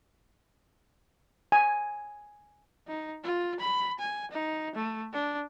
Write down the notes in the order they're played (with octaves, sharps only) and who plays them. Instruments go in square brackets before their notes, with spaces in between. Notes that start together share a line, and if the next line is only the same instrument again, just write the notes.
[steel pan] G#5
[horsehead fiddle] D#4
F4
B5
G#5
D#4
A3
D4